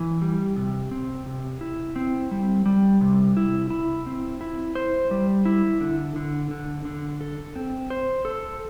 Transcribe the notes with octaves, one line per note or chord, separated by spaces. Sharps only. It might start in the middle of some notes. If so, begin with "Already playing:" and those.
Already playing: E3
G3
C3
C4
C3
E4
C4
G3
G3
C3
E4
E4
C4
E4
C5
G3
E4
D3
D3
D3
D3
A4
C4
C5
A4